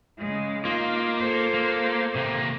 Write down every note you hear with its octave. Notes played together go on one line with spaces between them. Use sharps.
C#3 G#3
A#3 D#4 F4 F5
A4 C5
A#3
C3 A#3